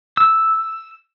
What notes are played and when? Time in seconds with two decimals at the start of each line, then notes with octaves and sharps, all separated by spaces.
0.17 E6